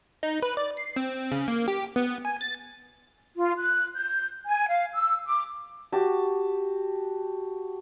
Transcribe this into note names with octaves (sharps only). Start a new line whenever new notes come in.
D#4
B4
D5
C7
C4
C#3
A#3
G4
B3
G#5
A6
F4
F#6
G6
G#5
F5
E6
D6
F#4 G4 A5